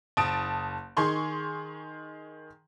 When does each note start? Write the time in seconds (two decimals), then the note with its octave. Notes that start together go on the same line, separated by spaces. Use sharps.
0.17 F#1 A5 D#6 D7
0.97 D#3 G#4 C6 C#6